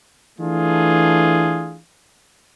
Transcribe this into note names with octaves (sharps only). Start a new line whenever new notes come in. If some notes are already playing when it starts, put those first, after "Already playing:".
E3 A3 D4 F4 G#4